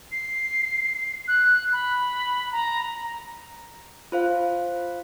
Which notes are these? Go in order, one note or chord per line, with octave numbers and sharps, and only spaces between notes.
C7
F#6
B5
A#5
F4 C5 F5